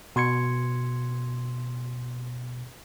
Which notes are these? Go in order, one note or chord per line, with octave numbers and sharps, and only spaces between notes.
B2 C6 G#6 C#7